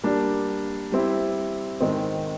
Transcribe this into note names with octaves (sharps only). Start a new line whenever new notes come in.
G3 A#3 D4
G3 C4 E4
G#2 D#3 G#3 C4